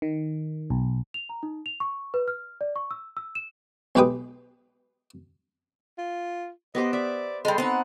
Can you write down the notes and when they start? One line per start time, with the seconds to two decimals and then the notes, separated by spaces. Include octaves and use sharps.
0.02 D#3
0.70 B1
1.14 F7
1.29 A#5
1.43 D#4
1.66 F7
1.80 C#6
2.14 B4
2.28 F6
2.61 D5
2.76 C#6
2.91 E6
3.17 E6
3.35 E7
3.95 B1 G#3 G4 B4 G5 D#6
5.98 F4
6.75 B3 G4 C5 D#5
6.93 D5 E5
7.45 G3 G#3 A4 C6
7.58 B3 C4 D#4 F#5